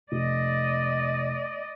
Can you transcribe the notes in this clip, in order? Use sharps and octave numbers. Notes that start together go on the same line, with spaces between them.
F1 D5 D#5